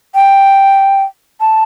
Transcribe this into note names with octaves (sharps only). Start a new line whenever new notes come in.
G5
A5